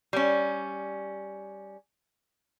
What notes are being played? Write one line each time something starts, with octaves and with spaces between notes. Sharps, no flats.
G3 C#4